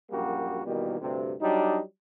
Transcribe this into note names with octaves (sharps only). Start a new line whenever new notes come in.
A#1 F#2 G3 A#3 F#4
B2 D#3 E3 G3 A#3
D2 G2 C3
F#3 G3 D4 D#4